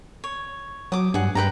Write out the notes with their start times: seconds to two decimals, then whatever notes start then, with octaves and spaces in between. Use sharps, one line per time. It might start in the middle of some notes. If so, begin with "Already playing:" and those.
0.24 C#5
0.92 F#3 D6 D#6
1.14 G2 G#4 F#5
1.35 G2 B4 G5 A#5